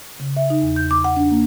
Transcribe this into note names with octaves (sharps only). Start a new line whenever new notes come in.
C#3
E5
D#4
E2
G6
D6
F#5
D4
A#3